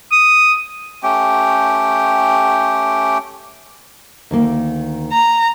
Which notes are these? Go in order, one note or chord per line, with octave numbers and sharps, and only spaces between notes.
D#6
A3 C#4 G4 G5
D2 D#3 A#3
A#5